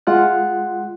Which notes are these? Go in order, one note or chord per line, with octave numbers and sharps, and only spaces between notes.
G#3 F4 F#5 F#6